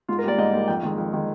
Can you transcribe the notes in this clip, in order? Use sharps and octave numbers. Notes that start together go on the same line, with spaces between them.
G#2 F4
A#4
G3 A#3 D5
G#2 D#5
G3 A#3
F2 G5
D#3 G#3
F2
D#3 G#3